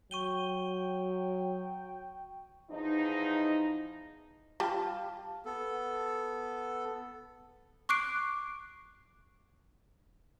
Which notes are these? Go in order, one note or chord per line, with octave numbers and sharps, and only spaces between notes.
F#3 G5 C#6 D#7 G7
E2 F3 D#4
G3 F4 G4 F5 A5
B3 A4
C#6 D6 F#6 C7 D7